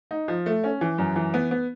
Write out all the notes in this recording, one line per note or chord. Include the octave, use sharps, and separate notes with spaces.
D#4
F3
A3
C#4
E3
F#2
E3
B3
B3